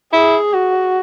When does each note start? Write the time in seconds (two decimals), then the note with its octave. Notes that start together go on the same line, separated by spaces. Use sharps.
0.13 E4 G#4
0.53 F#4